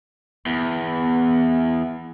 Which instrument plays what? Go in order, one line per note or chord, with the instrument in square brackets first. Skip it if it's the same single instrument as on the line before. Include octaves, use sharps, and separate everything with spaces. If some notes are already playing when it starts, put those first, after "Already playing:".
[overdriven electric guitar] E2 [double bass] B3